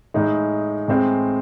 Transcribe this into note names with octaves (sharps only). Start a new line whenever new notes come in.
A2 G#3 D#4
A2 G#3 C4